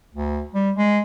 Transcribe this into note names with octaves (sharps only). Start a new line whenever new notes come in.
D2
G3
G#3